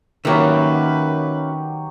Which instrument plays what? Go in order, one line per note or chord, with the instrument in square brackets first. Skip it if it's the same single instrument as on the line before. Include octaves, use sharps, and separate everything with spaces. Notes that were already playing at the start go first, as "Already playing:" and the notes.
[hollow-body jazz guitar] D#3 A#3 [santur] F#3 G4 [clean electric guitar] C#4 F#4 E5 [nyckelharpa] B4